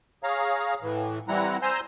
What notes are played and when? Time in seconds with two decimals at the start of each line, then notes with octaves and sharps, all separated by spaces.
0.23 G#4 C#5 F5 A#5
0.82 A2 E3
1.28 E3 G3 C4 E4 F#5 A#5
1.62 C5 G#5 A#5 C6 E6 G6